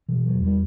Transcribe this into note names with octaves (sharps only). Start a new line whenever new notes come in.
B2 E3
F#3
E2
G3